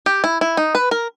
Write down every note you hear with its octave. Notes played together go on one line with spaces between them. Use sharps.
G4
E4
E4
D#4
B4
A#4